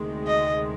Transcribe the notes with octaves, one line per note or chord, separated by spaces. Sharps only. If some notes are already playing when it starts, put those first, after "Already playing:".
Already playing: D2 C3 D#3 G#3
D#5